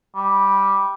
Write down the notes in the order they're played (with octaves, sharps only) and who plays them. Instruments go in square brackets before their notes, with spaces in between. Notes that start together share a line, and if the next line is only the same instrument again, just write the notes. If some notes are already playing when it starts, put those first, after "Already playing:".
[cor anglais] G3